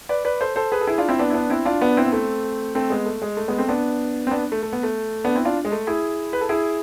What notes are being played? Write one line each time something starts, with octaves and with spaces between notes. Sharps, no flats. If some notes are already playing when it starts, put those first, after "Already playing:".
B4 D5
B4 D5
A4 C5
A4 C5
G#4 B4
A4
E4 G#4
D4 F4
C4 E4
B3 D4
E4
B3 D4
C4 E4
D4 F4
B3 D4
C4 E4
B3
A3 C4
A3 C4
G#3 B3
A3
G#3
A3
G#3 B3
A3 C4
B3 D4
C4
B3 D4
A3
A3
B3
A3
B3 D4
C4 E4
D4 F4
G#3
A3
E4 G#4
B4
A4
E4 G#4